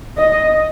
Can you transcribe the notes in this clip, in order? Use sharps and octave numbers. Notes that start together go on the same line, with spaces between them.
D#5